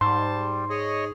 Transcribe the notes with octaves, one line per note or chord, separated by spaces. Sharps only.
G#2 G3 A5 C6
G#4 C#5 D#5